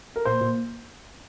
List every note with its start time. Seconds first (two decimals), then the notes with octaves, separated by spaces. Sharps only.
0.16 A#4
0.25 A#2 C5
0.41 A#2